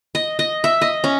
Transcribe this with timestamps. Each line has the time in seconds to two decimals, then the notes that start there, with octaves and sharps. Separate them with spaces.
0.15 D#5
0.39 D#5
0.64 E5
0.81 D#5
1.04 C#4